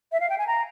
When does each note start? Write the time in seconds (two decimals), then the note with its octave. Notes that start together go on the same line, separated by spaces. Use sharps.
0.12 E5
0.20 F5
0.30 G5
0.38 G#5
0.47 A#5